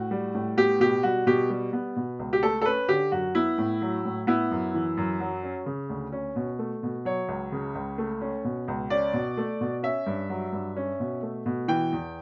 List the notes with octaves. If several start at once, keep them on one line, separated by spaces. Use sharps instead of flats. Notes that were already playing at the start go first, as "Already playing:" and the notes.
Already playing: A2 F#4
G3
A2
B3 G4
B2 G4
G3 F#4
B2 G4
G3
B3
B2
C#2
G4
A3 A4
A4
C#4 B4
D3 G4
F#2 F#4
B3 E4
A2
F#3
A2
B3 E4
F#2
E3
F#2
F#3
C#4
C#3
D2
C#4
B2
A3
B2
F#3 C#5
C#2
C#3
C#2
A3
C#4
B2
C#2
C#4 D5
B2
A3
B2
C#4 E5
G2
F#3
G2
C#4
B2
A3
B2
E3 G5
E2